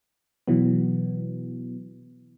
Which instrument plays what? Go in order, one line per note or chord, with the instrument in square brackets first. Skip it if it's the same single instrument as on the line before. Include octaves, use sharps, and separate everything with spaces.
[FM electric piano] B2 E3 F#3 B3